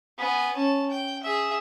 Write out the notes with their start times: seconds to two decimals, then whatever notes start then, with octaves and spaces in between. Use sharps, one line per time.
0.18 B3 G#5
0.56 C#4 A5
0.91 G5
1.23 G#4 E5